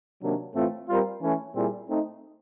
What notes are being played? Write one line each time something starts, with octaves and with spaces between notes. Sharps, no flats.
C3 D#3 F#3 A#3 D4
A2 E3 A3 C4 F4
G3 C4 F4 A#4
E3 A3 C#4
A#2 G3 C4 E4 G#4
A3 C4 D#4